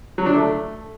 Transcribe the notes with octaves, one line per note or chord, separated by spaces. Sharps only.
F#3
D4
A3